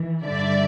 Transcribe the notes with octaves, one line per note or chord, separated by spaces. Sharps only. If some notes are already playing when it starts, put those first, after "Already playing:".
Already playing: E3
G2 D3 G3 D5 E5